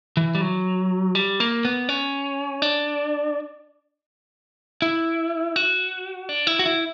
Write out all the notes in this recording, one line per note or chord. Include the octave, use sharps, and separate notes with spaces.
E3
G3
F#3
G3
A#3
B3
C#4
D4
E4
F#4
D4
E4
F#4
E4